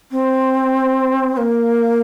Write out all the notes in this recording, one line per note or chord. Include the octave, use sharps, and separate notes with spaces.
C4
C4
A#3